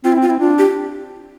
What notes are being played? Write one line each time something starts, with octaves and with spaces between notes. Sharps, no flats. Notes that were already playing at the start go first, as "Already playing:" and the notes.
C4 F4
E4
C4
F4
C4 E4
D4 F4
G4